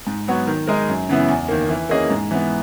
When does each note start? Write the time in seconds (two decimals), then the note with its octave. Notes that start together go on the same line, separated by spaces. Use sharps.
0.07 G#2
0.28 F#3 B3 F#4 C#5
0.47 D#3
0.67 G#3 D#4 A#4
0.88 F#2
1.09 C#3 E3 B3 E4
1.28 E2
1.49 D#3 A#3
1.69 E3
1.89 A#3 C#4 G#4 D#5
2.10 G#2
2.31 E3 B3